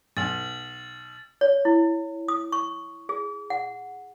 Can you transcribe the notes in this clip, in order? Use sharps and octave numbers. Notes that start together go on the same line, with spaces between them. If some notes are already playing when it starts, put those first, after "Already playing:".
B1 A6 F#7
C#5
E4
D#6
C#6
G#4
F#5